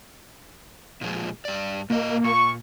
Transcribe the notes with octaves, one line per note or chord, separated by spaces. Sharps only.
A#2 F3 G#3
G2 D5
A#2 A#3 D#5
A#2 C#6